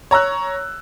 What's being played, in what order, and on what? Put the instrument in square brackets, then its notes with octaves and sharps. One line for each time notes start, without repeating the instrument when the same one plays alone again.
[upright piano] C#5 A#5 E6 F#6